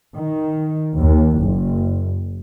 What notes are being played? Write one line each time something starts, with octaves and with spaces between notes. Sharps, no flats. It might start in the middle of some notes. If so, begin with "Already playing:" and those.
D#3
D#2
F#1